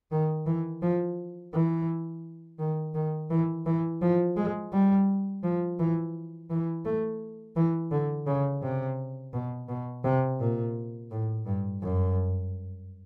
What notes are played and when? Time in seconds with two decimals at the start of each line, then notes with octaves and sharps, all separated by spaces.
0.11 D#3
0.46 E3
0.82 F3
1.53 E3
2.59 D#3
2.95 D#3
3.30 E3
3.66 E3
4.02 F3
4.37 G#3
4.73 G3
5.43 F3
5.79 E3
6.50 E3
6.85 A3
7.56 E3
7.91 D3
8.27 C#3
8.63 C3
9.33 B2
9.69 B2
10.04 C3
10.40 A#2
11.11 A2
11.46 G2
11.82 F#2